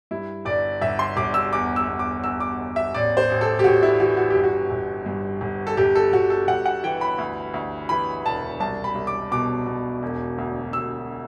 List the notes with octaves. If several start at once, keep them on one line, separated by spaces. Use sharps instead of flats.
G2 E4
G1 D5
G1 E5
C6
G1 D6
E6
E2 D6
E6
E2
D6
E2 E6
D6
E2
E5
A1 D5
C5
A1
A4
G4
A1 F#4
E4
E3 F#4
F#4
G1 G4
F#4
G1
G2
G1
A4
G1 G4
A4
G1 F#4
A4
G1 F#5
F#5
E3 G5
B5
D2
D2
E3 B5
E1 A5
C2 A5
B5
C2
D6
B2 D6
B2
E1
D2
E1 E6